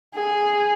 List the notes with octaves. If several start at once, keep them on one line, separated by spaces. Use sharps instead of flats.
G#4